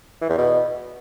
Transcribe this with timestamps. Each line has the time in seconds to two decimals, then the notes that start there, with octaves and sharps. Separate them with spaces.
0.21 E3
0.30 E2
0.38 B2